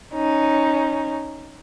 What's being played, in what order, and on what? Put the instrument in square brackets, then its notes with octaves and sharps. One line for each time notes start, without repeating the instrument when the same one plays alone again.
[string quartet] C#4 D#4